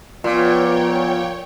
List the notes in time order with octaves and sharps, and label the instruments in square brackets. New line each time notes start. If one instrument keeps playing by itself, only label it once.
[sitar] A#2 [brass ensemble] F3 B3 D5 [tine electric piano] F4 [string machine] C#5 G5